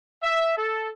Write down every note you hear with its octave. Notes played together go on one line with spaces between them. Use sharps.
E5
A4